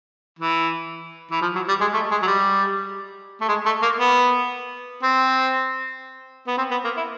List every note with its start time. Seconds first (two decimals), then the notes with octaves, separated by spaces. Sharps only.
0.39 E3
1.31 E3
1.42 F3
1.55 F#3
1.68 G3
1.81 G#3
1.94 A3
2.11 G#3
2.23 F#3
2.27 G3
3.41 A3
3.48 G#3
3.66 A3
3.82 A#3
4.00 B3
5.03 C4
6.47 B3
6.58 C4
6.71 B3
6.84 A#3
6.97 E4